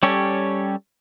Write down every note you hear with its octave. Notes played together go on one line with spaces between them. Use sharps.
G3 C#4 G4 A4 C#5